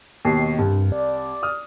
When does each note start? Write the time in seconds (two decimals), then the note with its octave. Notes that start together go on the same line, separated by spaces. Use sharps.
0.25 D#2 B2 D#3 C7
0.59 C2 G2
0.92 D5
1.43 D#6 F6